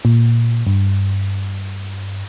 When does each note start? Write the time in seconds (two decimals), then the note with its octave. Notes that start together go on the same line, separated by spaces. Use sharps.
0.05 A#2
0.67 G2